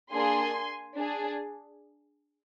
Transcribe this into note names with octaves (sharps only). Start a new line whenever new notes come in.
A#3 D4 G#4 G#5 C6
D4 G#4